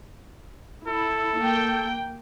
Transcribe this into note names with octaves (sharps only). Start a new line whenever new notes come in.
E4 A4
A#3 G5